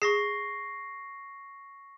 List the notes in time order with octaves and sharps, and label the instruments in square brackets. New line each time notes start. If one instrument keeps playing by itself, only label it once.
[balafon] G#4 [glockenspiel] C#6 A#6 C7